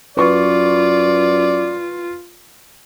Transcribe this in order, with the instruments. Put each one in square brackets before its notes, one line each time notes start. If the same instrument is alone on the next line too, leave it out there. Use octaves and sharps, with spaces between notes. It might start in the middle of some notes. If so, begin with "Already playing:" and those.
[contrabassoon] F#2 [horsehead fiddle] F4 [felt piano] B4 C#6 [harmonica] D5